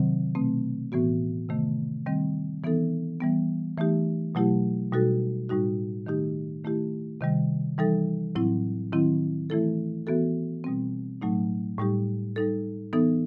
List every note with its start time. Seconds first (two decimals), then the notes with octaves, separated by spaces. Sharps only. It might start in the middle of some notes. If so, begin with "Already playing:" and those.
Already playing: C3 D#3 F#3 C4
0.35 B2 A3 C4
0.92 A2 E3 B3 F#4
1.49 C3 D#3 A3
2.06 D#3 G3 C4
2.64 E3 B3 D#4 A4
3.21 E3 G3 B3
3.78 E3 A3 D#4 G4
4.35 B2 F#3 A3 E4 G4
4.92 B2 G3 D#4 F#4 A4
5.49 A2 G3 D#4 F#4
6.06 D#3 A3 D#4 G4
6.64 D#3 A3 E4 G4
7.21 C3 D#3 G3
7.78 E3 G3 D#4 A4
8.35 A2 F#3 C4 E4
8.92 D#3 F#3 C4 E4
9.50 E3 A3 E4 A4
10.07 E3 B3 F#4 A4
10.64 B2 G3 C4
11.22 A2 F#3 A3 D#4
11.79 A2 G3 D#4 G4
12.36 G3 D#4 A4
12.93 E3 B3 D#4 A4